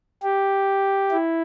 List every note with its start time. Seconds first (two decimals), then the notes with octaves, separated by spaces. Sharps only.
0.23 G4
1.12 E4